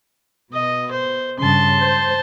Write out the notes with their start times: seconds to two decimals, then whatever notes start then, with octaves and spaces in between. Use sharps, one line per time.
0.53 B2 D#5
0.91 C5
1.39 G2 C#3 A5 C6
1.81 C5